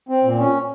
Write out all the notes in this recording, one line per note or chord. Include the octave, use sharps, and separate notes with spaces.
C4
A#2
C#4